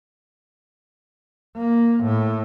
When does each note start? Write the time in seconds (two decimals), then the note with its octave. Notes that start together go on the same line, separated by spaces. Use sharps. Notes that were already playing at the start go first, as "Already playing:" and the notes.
1.57 A#3
2.03 A2